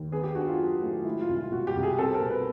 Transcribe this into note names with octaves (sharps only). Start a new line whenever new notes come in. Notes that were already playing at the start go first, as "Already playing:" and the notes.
Already playing: D#2
B3 G#4
G4
D4 F#4
F4
F#3
A2
G#3 E4
F4
C2
F4
B2 F#4
G4
C2
G#4
C4 A4
A#4
B2
B4